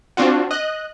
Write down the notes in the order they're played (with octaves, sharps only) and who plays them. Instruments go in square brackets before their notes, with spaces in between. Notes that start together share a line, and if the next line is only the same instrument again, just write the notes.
[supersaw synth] C4 D4 F4 F#4
D#5 F#6